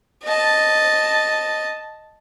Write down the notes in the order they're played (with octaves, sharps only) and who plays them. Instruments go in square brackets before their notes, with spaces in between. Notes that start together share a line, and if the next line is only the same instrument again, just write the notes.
[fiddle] D#5 A5